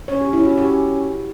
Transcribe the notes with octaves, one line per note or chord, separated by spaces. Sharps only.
C#4 C#5
G4
E4
F#4
G4